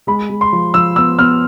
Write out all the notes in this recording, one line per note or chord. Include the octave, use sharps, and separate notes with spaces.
G#3 B5
G#3
C6
F3
F3 E6
B3 E6
B3 F6